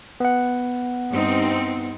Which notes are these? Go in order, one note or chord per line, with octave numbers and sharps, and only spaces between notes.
B3 F#5
G2 C4 D#4